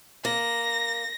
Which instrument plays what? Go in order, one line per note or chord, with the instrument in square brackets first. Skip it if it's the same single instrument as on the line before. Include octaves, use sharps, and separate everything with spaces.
[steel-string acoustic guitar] A#3 [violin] A#6